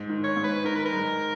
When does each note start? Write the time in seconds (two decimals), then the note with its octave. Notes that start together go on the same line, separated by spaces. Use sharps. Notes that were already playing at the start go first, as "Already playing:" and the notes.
Already playing: G#2
0.10 D#3
0.24 C#5
0.37 G#2
0.44 B4
0.64 D#3 A#4
0.75 B4
0.85 A#4
0.92 G#3